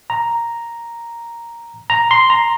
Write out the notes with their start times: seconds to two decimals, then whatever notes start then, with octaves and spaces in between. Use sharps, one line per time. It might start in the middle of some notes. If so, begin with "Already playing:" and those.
0.10 A#5
1.90 A#5
2.11 C6
2.30 A#5